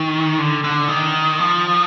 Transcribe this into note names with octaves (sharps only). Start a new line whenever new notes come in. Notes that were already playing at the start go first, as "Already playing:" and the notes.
Already playing: D#3
D3
D3
D#3
F3